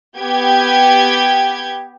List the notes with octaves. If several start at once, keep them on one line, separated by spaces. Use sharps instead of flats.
B3 G4 G6 G#6